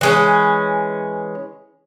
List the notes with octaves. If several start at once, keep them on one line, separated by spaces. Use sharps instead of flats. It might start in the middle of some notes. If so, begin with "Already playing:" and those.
E3 G#3 C#4